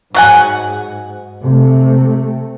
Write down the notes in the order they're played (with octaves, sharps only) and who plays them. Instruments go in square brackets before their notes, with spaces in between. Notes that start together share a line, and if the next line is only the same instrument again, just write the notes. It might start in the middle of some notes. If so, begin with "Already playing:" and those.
[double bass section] G#2 [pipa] F#3 F#5 G#5
[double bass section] C3 A3